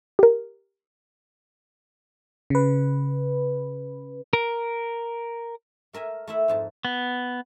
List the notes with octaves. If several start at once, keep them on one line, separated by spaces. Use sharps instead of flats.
G4 A#4
C#3 B4
A#4
A3 A#4 E5 G#5
A3 E4 E5
F2 G#2 A5
B3